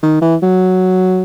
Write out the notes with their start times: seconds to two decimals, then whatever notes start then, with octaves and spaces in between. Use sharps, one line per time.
0.03 D#3
0.21 E3
0.42 F#3